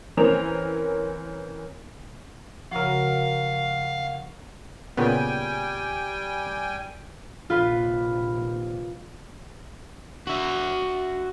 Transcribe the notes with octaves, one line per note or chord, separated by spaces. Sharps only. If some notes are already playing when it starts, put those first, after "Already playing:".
E3 C4 C#4 A#4 F7
C#3 F3 F#4 A#4 F5
A#2 C#3 G3 B3 G5 G#5
A#1 D#2 C3 F4 B4
F#4 E5